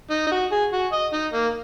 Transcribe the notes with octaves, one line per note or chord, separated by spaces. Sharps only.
D#4
D#4
F#4
G#4
F#4
D#5
D#4
A#3